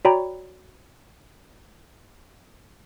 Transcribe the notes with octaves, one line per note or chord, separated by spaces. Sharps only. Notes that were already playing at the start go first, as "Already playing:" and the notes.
F#4 C#5 D5 G5 A#5 B5